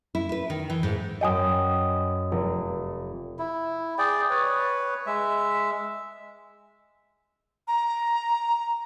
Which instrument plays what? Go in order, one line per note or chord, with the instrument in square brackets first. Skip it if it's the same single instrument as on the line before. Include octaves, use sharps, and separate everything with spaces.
[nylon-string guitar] E4
B4
D#3
E3
G#2
[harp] F#2 G5 D#7 [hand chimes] D#5 G#5 D#6
[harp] F1
[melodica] E4
G#4 D5 G5
B4 C#5
G#3 E5
[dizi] A#5